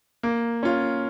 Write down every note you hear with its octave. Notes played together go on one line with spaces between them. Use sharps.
A#3
C#4 F4